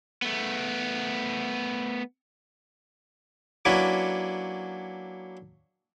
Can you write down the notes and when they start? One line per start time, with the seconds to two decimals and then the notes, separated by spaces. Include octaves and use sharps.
0.22 A3 B3
3.65 F#3 A#3 C#4 D4 E4 B4